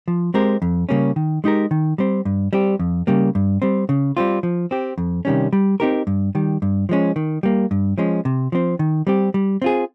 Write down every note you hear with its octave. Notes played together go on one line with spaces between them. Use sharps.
F3
G#3 C4 G4 A#4
F2
C#3 G3 A#3 C#4
D#3
G#3 D#4 G4 A#4
D#3
G3 C4
G2
G3 C4 G4
F2
C#3 G3 A#3
G2
G3 C4
C#3
G3 C4 F4
F3
C4 G4
F2
C3 D#3 G3 C#4
G3
C4 D#4 G4 A#4
G2
D#3 G3
G2
F3 G#3 C#4
D#3
G3 A#3
G2
F3 G#3 C#4
C3
F3 C4
D#3
G3 C4 G4
G3
C4 F4 G#4